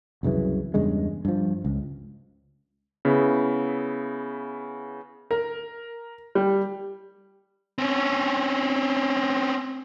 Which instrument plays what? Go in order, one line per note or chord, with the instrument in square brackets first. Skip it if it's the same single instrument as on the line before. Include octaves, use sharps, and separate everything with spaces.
[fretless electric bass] C2 F#2 C#3 E3
E2 G2 C#3 G#3
G2 F3
C#2
[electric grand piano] C#3 B3 E4
[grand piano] A#4
G3
[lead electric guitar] C4 C#4